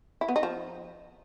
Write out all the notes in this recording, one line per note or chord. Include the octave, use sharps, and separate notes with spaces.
E4
B3
D#4
F3